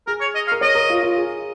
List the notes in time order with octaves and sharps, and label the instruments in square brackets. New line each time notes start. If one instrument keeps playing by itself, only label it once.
[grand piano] G#4 [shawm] A#4
[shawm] C#5
D#5
F5
[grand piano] A#4
[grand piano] C#5 [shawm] D#5
[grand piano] A#4
F4
F4
G#4